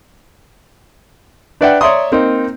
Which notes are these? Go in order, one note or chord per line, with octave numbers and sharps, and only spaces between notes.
D4 B4 D5 E5 F#5 G5
C#5 D5 E5 A#5 C6 D#6
A#3 C4 D#4